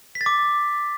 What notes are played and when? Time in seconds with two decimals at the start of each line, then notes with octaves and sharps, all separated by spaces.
0.15 B6
0.21 A6
0.26 D6